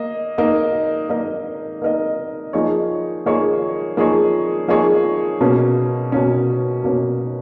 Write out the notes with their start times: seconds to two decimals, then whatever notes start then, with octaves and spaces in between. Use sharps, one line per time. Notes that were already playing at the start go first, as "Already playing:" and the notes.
Already playing: A#3 D#5
0.38 A#3 D#4 A#4 D#5
1.10 A#3 D#4 A#4 D#5
1.82 A#3 D#4 A#4 D#5
2.53 F3 A#3 D#4 G#4 C#5
3.26 F3 A#3 D#4 G#4 C#5
3.97 F3 A#3 D#4 G#4 C#5
4.68 F3 A#3 D#4 G#4 C#5
5.41 B2 A#3 C#4
6.12 B2 A#3 C#4
6.84 B2 A#3 C#4